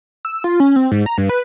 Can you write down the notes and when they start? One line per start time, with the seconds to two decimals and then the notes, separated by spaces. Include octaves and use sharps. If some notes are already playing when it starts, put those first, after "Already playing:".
0.25 E6
0.44 F4
0.60 C#4
0.76 C4
0.92 G#2
1.06 A#5
1.18 G2
1.29 B4